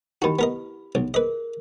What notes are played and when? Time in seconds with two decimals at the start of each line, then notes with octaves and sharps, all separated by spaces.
0.22 D#3 E4 F#4 G4 B5
0.39 B3 A#4 D#5
0.95 B1
1.14 G#4 A#4 B4 D#5